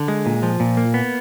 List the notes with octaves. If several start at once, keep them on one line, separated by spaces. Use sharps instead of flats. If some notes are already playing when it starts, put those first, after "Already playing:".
Already playing: D3
G#3
A#2
F3
A#2
A#3
B3